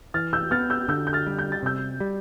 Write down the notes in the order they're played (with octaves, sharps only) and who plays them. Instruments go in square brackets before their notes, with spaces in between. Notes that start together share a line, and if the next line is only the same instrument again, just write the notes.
[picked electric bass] E3 [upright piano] F6 A6
[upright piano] E6 G6
[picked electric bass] B3 [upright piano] F6 A6
[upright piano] E6 G6
[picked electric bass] D3 [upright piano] E6 G6
[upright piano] G6
F6 A6
[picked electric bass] G3
[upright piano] G6
A6
[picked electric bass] C3 [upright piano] E6 G6
[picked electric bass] G3